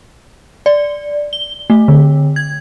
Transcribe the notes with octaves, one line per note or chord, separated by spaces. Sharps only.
D5
G7
A3
D3
G#6